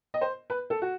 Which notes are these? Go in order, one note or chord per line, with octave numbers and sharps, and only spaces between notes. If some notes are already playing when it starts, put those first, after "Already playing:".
D#5
C5
B4
A4
F#4